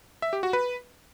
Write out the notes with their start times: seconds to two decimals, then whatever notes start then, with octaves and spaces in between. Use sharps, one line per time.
0.22 E5
0.33 G4
0.43 F#4
0.53 B4